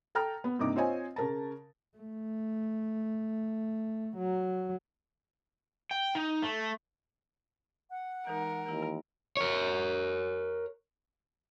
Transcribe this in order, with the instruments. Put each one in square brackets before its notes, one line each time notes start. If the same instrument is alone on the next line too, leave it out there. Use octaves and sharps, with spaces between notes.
[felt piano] A4 G5 A#5 F6
B3
G2 C3 A#3 D#4 D6
C4 F4 C5 C#5 D#5 G#5
C#3 A#4 A5
[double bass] A3
F#3
[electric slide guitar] G5
D#4
A3
[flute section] F#5
[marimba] E3 G#3 D#4 [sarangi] A#4
[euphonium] D#2 [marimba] E3 E4
[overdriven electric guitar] A#4 C#5